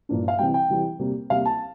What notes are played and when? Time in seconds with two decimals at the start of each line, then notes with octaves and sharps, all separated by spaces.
0.09 G2 F3 A#3 D4
0.28 F5
0.39 C3 E3 G3 G5
0.54 G5
0.70 C3 E3 G3
0.99 C3 G3 A#3
1.30 C3 G3 A#3 F5
1.45 A5